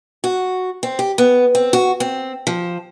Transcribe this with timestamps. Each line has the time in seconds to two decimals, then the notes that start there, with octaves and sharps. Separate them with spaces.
0.24 F#4
0.83 C4
0.99 G4
1.18 B3
1.55 C4
1.73 F#4
2.00 C4
2.47 F3